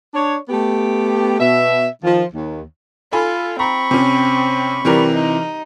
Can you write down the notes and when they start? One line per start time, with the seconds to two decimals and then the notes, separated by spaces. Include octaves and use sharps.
0.14 D4 C#5
0.49 A3 B3 G4
1.40 B2 E5
2.03 D#3 F3
2.33 D#2
3.13 F4 A4 G#5 B5
3.59 C4 A#5 B5 C#6
3.91 C3 C#4
4.85 C3 E3 G3 A#4
5.14 D#4